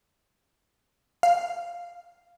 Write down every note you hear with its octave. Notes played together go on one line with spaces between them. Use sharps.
F5